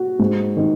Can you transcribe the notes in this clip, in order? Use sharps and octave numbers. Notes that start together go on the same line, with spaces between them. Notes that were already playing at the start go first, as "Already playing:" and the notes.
Already playing: F#4
G#2
D#3